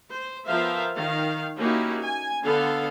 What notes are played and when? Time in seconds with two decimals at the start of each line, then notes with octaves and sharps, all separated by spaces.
0.11 C5
0.47 F3 B3 A#4 C5 E5 F5
0.97 D#3 F5
1.58 A#3 C#4 D#4 E4 F#4 G4
2.02 G#5
2.44 D3 B3 A4 F5